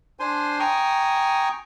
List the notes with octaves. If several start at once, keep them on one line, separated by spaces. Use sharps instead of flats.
D4 C5 G#5 C6
G5 G#5 A#5 C#6 D#6